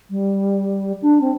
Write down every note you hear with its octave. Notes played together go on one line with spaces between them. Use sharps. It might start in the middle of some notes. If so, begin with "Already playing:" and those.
G3
D4
C4